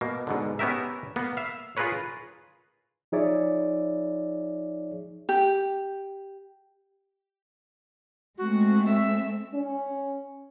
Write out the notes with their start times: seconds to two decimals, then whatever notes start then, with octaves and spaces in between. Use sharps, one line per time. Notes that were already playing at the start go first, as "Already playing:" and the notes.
0.01 B2 A#3
0.27 G#2 B2 D3
0.59 B3 C#4 G4 A#4 E5
1.16 A#3 B3
1.37 E5 F5
1.77 F4 G#4 A#4 B4 C#5
3.12 F3 D#4 G#4 C#5 D5 E5
5.29 G4
8.38 G#3 A3 C4 F#4
8.85 E5
9.54 C#4